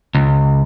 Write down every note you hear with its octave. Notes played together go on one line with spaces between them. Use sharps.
C#2